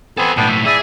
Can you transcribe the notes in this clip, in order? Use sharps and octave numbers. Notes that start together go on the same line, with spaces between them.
B3 C4 A4 C5 G#5
B1 A2 B3 D4 G5
E5
E4 G#4 D5 E5